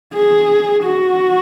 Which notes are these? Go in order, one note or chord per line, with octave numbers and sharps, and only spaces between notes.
G#4
F#4